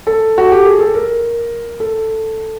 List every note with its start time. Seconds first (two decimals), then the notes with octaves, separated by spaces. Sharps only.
0.07 A4
0.38 F#4
0.52 G4
0.66 G#4
0.80 A4
0.94 A#4
1.80 A4